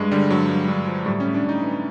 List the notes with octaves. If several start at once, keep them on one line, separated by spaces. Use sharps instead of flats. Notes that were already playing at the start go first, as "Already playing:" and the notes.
Already playing: G2 G#3
D3 G3
G2 F#3
G2
G2
F3
A2 G3
A2 C#4
D4
A2
D#4
E3